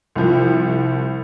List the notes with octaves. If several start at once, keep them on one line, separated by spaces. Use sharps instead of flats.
C2 F3